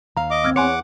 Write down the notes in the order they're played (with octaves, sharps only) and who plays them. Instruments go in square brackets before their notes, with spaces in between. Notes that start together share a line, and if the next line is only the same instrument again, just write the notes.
[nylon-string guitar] D#2 F5 [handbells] A#5
[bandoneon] D#5 D6
[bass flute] C4 [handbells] E6 F6 G#6
[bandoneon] E2 F#5 D6 [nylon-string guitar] C#5 [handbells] G#5 C6 C#7